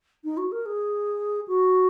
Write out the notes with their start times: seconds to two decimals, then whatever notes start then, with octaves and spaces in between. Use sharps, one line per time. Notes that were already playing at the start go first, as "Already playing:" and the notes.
0.24 D#4
0.37 F#4
0.52 A#4
0.66 G#4
1.48 F#4